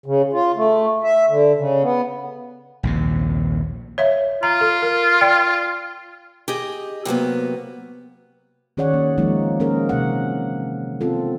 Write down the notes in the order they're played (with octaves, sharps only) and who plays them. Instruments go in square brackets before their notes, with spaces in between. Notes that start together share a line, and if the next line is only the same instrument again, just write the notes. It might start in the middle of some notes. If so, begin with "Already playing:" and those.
[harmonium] C#3
F4
A3
E5
D3
C#3
B3
[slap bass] A#1 D#2 C3
[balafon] C#5 E5 F5
[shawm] F4 [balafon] A#5
[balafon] A4
A#4
D5 G5
[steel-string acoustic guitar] G4 G#4 D#5
C3 F#3 A#3 B3
[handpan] D#3 C#4 G#4 C#5 D5 F#5
A#3
F3 G#3 A#3 D#4
A#3 C#4 G#4 A#4
C3 E3 F#5
B3 C4 F4 A4